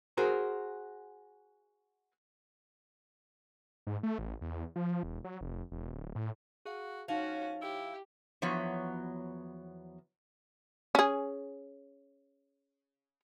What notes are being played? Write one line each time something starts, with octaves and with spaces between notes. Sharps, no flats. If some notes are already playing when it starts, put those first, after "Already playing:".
F#4 G#4 A#4 C5
G#2
A3
A1
E2
F3
E1
F#3
F1
E1
D1
A2
F#4 G#4 F5
F3 C#4 D#4 F#4 C#5 F5 F#5
E4 G4
E2 F3 F#3 B3 F#4 C#5
C#4 G#4